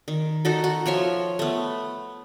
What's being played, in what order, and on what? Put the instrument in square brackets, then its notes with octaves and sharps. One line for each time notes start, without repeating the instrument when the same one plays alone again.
[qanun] D#3
D#4 F#4 A4
F#4
F3 C#5 E5 C6
A3 B3